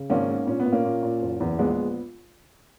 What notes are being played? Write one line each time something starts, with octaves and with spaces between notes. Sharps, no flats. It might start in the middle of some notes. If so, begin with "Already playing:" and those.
Already playing: C#3
G#1 A#3 C#4
G#2
A#2 C#4
B3
A#2
A#3 C#4
A#2
A#2
F#1
E2
A#1 G#3 B3